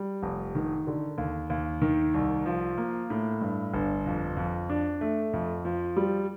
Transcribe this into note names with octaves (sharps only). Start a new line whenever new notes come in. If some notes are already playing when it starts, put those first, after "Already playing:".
Already playing: G3
F1
D#3
D3
D#2
D#2
D#3
C2
F3
A#3
A2
G2
G1
F2
F2
D4
A3
F2
F3
G3